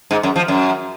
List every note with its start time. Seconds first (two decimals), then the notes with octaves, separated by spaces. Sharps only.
0.11 G#2
0.23 F#2
0.36 F3
0.48 F#2